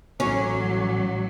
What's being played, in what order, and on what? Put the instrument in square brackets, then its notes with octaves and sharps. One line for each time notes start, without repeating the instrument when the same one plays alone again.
[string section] A1 F#3 [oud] C#4 [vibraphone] F#4 D6